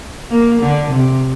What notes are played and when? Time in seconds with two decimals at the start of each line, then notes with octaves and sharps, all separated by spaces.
0.31 A#3
0.61 D3
0.91 C3